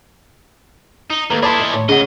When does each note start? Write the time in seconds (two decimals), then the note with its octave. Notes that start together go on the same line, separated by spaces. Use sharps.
1.10 D#4
1.30 D#2 A#3 A4 B4 A#5
1.43 E4 G#4 D5 A5 B5 C6
1.60 D#5
1.74 D#2 A2 C#5
1.89 C#2 C#3 G#4 C#5 D#5 F#5